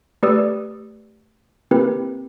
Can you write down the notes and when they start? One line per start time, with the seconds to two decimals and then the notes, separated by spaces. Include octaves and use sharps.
0.23 A3 G4 B4 D5 D#6 E6
1.71 A#3 C4 E4 G4 A#4 B4